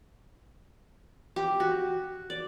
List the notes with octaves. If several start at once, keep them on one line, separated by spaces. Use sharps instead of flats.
G4
F#4
D5